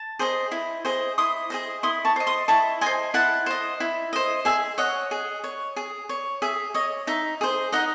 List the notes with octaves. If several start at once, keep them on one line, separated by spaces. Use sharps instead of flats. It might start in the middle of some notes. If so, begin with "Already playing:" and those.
Already playing: A5
G#4 C5 D#5
E4
G#4 C5 D#5
E4 C6 D#6
G#4 C5 D#5
E4 C6 D#6
A5 C#6
C5 D#5
C6 D#6
E4 A5 C#6
C5 D#5 G#5 C6
E4 F#5 A5
C5 D#5
E4
C5 D#5
G#4 E5 G#5
C#5 D#5 F#5
G#4
C#5
G#4
C#5
G#4 E5
C#5 D#5
D#4 E5
G#4 C5
D#4 D#5 F#5